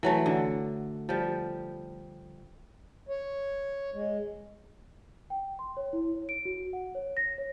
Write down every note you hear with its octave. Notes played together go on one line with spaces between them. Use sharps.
E3 F#3 A3
D3
F3 G3
C#5
G#3
G5
C6
C#5
E4
C#5
D7
F#4
F#5
C#5
A#6
C#5